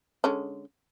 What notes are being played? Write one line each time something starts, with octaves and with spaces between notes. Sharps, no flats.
D3 G#3 C#4